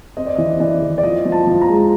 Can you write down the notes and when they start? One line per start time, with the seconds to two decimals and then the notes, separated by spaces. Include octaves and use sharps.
0.17 C4 D#5
0.26 D5
0.36 E3 D#5
0.60 E3 D5
0.82 E3
0.98 D5
1.03 F3 D#5
1.25 F3
1.32 A5
1.47 F3
1.61 A#5
1.69 G#3